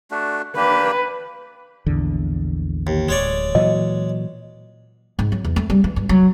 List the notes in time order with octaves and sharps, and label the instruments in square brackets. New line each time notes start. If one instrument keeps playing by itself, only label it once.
[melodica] A3 D4 F#4
[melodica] A#3 D4 G4 [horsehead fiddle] B4
[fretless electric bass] A#1 E2 D3
[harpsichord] D#2
[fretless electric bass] D1 [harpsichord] G#3 C#5 D5
[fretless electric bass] A#2 E3 F#3 [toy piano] D#5
[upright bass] G#2
F#3
E2
A3
G3
E3
G2
F#3